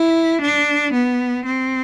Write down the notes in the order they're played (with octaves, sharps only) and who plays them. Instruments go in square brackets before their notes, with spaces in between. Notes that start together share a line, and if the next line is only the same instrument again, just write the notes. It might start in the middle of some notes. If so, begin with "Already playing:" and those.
Already playing: [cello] E4
D4
B3
C4